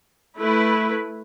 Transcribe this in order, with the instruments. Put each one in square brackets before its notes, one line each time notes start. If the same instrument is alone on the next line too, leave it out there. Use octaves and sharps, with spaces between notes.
[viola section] A3 E4 B4